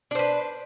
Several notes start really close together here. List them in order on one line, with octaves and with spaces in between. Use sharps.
D4 C5 B4